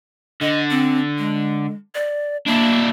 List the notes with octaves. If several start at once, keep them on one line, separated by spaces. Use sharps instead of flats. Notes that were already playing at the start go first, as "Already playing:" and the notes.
D3 D#5
C4
G#3
D5
A#3 D4 E4